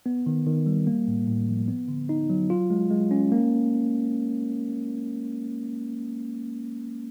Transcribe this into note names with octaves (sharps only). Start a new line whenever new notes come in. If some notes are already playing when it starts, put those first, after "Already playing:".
B3
D#3
D#3
G3
A#3
A2
A2
F3
B3
D3
D#4
F#3
F4
G#3
G#3
C#4
A#3